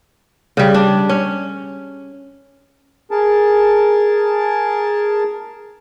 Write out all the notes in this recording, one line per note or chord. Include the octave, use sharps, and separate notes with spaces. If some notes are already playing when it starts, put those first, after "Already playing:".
C#3 G3
D4
C#4
G#4 A#4 A5